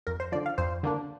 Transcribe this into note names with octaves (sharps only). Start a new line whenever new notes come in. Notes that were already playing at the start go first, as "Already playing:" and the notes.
F2 A#4
C5
D3 F3 D5
F5
F2 C5
D3 A#3 D4